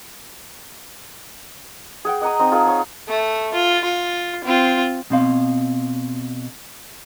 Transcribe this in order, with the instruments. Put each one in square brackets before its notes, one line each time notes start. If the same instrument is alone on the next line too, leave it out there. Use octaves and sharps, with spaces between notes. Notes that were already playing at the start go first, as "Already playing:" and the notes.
[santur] G#4 F#5 G5
D#5 F#5 A#5 D#6
C4 D#4
F4 G#4 F#5 A5
G#4 C#5
[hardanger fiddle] A3
F4
F4
C4 F4
[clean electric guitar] B2 C4 F5